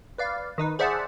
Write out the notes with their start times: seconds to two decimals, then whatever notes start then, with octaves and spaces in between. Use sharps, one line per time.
0.18 B4 D5 F5
0.58 D#3 D#4 B4
0.79 G#4 C5 D5 E5 F#5 A5